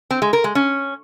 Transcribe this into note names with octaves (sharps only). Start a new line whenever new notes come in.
C4
G#3
A#4
G#3
C#4